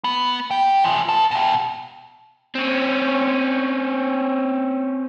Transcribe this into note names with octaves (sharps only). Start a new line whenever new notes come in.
B3
G4 G5
E3 F3
B4 A5
B2 G4
C4 C#4